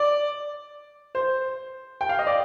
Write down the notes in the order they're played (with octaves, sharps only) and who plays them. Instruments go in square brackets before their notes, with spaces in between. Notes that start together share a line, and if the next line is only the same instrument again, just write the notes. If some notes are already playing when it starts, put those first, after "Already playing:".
Already playing: [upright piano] D5
C5
G5
F5
D#5
D5